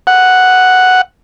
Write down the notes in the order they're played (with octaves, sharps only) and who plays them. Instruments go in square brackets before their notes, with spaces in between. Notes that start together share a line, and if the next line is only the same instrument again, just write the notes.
[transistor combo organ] F#5